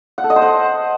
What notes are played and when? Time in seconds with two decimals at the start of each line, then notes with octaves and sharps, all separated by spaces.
0.18 F#5
0.24 A4
0.30 D#5
0.36 C5
0.42 F#5